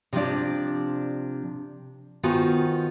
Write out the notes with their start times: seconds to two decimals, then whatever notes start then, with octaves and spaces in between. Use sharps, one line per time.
0.13 C3 F3 D4 D5
2.23 D#3 B3 F4 F#4 C5 G#5